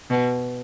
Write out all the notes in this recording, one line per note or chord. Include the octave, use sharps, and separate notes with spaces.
B2